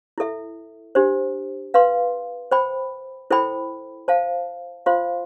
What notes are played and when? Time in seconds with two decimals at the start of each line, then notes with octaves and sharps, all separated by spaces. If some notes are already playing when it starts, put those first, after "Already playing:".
0.18 E4 A4 E5
0.95 D4 G4 C5
1.74 B4 F5 C6
2.51 C5 G5 B5
3.31 E4 A4 C5 G5 B5
4.08 C5 F5 A5
4.86 F4 C5 F5 C6